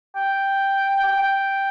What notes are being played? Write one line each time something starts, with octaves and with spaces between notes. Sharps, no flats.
G5
G5
G5